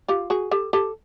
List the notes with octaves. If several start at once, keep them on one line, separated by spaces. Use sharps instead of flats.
F4 G4
F#4 G#4
G4 A4
G4 A4